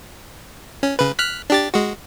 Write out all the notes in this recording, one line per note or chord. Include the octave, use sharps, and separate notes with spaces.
C#4
C#3 B4
F6 F#6 B6
D4 G4 A6
G#3 F#4